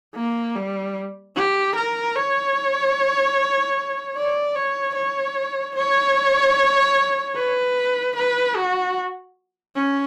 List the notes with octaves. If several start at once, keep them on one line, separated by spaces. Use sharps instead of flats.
A#3
G3
G4
A#4
C#5
D5
C#5
C#5
C#5
B4
B4
F#4
C#4